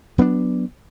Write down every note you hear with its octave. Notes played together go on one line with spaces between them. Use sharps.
F#3 B3 C#4 D4